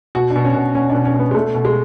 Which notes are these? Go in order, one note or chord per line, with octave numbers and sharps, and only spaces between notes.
B2 F#4
D4
B2
C#4
B2
B2 C#4
B2 D4
C#4
B2
B3
G#3
B2 A3
B2
G#3